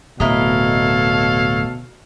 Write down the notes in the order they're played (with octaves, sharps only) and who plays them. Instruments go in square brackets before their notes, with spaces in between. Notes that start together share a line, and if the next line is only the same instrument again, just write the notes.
[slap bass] D1 [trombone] B2 [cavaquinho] E4 A#4 D#5 [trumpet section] A4 C#5 F5